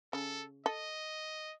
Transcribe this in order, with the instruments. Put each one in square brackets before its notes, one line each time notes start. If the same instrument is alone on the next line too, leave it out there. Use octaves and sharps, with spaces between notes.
[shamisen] C#3 [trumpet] A4
[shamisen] A4 [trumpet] D#5